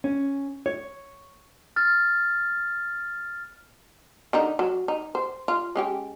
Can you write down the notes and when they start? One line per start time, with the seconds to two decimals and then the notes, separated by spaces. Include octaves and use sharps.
0.04 C#4
0.66 C#5
1.76 F6 A6
4.33 D3 D#3 D#4
4.59 F#3
4.88 D#4
5.15 C5
5.48 F4
5.76 G#3 C#4 G4